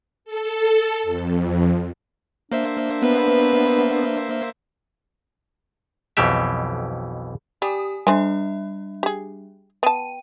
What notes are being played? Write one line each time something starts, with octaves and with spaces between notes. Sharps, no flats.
A4
F2
A#3 D4 C5 E5
B3 B4
B1 F2 B2 E3 G4 E5
G3 G4 G#5 D#6
D3 G3 D4 C5 E5 G#5
G4 G#4
B3 G5 A5 D#7